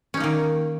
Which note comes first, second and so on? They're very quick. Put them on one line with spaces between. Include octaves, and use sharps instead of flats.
C#4 D#4 A#3 D#3